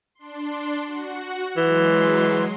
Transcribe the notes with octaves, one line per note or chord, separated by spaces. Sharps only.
D4 C6
F#4 F#5
E3 F#3 G#3 C6